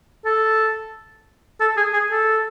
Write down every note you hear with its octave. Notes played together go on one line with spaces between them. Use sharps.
A4
A4
G#4
G#4
A4